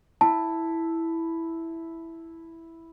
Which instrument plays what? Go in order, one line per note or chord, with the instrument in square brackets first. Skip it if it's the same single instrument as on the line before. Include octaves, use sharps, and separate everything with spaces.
[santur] E4 [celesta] A5